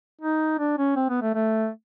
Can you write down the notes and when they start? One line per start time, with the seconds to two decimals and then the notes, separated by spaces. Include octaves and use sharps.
0.21 D#4
0.59 D4
0.78 C#4
0.96 C4
1.09 B3
1.22 A3
1.35 A3